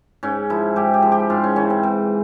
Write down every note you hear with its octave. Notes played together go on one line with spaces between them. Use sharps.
G#2 C#4
F3 E4
G#2 G4
G4
F3
G4
G#2 F4
C#4
E3 C#4
C4
G#2 C4